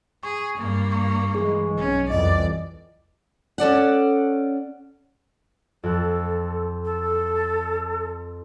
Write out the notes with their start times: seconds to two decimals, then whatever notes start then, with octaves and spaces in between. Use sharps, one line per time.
0.23 G#4 C#6
0.58 G2 A#3
0.92 C#6
1.35 E3 G#3 G#4 C#6
1.77 B1 C#4
2.10 C2 F2 E3 D5 D#5
3.58 C#4 A4 D5 F#5
5.83 F2 A4 F#6
6.85 A4